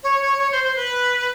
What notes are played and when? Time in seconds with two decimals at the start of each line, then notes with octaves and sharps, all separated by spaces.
0.04 C#5
0.22 C#5
0.39 C#5
0.52 C5
0.64 C5
0.76 B4